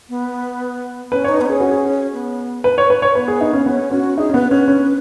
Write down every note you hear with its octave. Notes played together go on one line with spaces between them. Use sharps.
B3
C#4 B4
C#5
D#4
B3 B4
C#4 G#4
F#4
G#4
B3
B4
C#5
B4
C#5
B3 B4
G#4
D#4
C#4
B3 C#4
C#4 F#4
D#4 G#4
C#4
B3 B4
C#4 B4
C#4